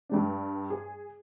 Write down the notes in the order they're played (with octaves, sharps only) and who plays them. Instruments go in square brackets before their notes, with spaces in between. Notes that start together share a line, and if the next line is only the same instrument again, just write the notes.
[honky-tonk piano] G2 G3 D4
G#4